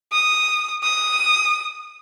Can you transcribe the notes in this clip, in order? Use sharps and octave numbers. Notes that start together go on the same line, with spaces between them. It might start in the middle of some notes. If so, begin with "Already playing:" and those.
D#6
D#6